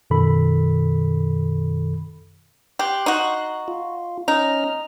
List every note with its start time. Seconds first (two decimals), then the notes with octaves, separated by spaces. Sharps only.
0.10 F#2 B2 D#3 A4 B5
2.79 G4 C6 F#6
3.06 D#4 F#4
3.68 F4
4.28 C#4 D#4 A#5 F6